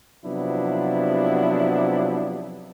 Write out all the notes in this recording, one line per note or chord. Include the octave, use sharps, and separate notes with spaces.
C3 F3 F#3 B3 D4 E4